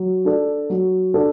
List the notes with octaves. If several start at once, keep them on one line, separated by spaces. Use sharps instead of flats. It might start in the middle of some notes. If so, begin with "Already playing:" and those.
Already playing: F#3
D4 A4 D5
F#3
D4 A4 D5